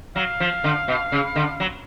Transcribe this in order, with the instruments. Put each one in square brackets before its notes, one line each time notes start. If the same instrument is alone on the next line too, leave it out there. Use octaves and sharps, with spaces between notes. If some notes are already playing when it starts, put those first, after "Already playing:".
[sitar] F#3 [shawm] F5
[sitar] F3
D3
B2
C#3
D3
F#3